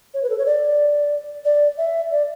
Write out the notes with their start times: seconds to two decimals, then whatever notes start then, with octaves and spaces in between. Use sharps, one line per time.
0.14 C#5
0.23 B4
0.30 A4
0.38 C#5
0.46 D5
1.45 D5
1.78 E5
2.11 D5